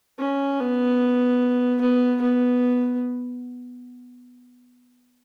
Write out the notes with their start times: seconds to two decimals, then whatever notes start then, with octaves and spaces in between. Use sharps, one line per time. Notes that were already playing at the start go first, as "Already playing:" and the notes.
0.19 C#4
0.59 B3
1.81 B3
2.22 B3